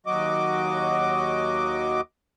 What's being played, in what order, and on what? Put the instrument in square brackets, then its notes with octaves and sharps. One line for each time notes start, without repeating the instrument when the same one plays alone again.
[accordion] D#2 F#3 F#4 D#5 D6